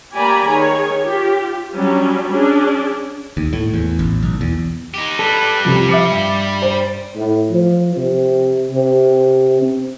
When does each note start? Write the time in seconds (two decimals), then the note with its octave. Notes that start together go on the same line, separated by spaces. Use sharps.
0.13 A#3 G4 D5 G#5 A#5 B5
0.48 D#3 G#4 C#5
1.01 F4 G4
1.75 F#3 G3 C#4 D4
2.27 C#4 D4 G#4
3.37 D#2
3.53 A2
3.74 E2
3.99 A1
4.23 B1
4.41 E2
4.94 D#4 G4
5.19 G3 A4 B4
5.65 C2 F2 C3
5.89 F3 E5 D6 C#7
6.09 G2
6.62 C5
7.16 A2
7.51 F3
7.96 C3
8.72 C3
9.62 C4